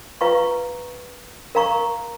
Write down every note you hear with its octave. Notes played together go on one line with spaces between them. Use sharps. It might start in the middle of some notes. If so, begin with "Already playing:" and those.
F4 B4 F5 A#5 C#6
A#4 F5 A#5 C#6